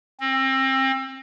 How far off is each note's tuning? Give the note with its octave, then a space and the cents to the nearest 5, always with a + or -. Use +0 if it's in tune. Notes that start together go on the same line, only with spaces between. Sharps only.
C4 +30